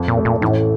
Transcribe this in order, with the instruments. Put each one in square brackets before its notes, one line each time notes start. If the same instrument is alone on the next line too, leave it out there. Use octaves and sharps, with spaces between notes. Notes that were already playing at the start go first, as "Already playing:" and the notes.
Already playing: [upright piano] F2
[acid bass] A#2
[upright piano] A3
[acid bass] A#2
[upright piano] A1 [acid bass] A2